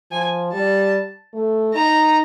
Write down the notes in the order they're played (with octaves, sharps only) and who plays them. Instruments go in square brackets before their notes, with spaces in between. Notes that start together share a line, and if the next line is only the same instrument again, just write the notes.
[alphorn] F3 [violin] G#5
[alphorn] G3 [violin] A5
[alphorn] A3
[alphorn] D#4 [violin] A#5